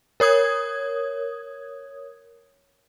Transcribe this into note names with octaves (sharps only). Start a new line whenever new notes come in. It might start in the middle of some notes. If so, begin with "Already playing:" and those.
A#4 C#5 D#6 G#6